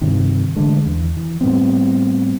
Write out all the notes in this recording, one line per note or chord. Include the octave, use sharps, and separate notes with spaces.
G2 C3 D#3
A1 D3 G#3
E2
E3
A2 G3 B3 C4